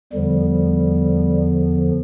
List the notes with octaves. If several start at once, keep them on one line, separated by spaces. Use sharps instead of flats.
E2 D3 F3 G3